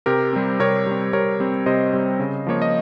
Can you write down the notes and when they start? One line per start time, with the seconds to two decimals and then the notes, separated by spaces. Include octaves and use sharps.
0.06 C3 G4 A#4
0.33 G3 C4
0.60 C3 A#4 C#5
0.86 G3 C4
1.13 C3 A#4 C#5
1.40 G3 C4
1.66 C3 C5 D#5
1.93 G3 C4
2.20 C#3
2.47 F3 A#3 C#5
2.62 D#5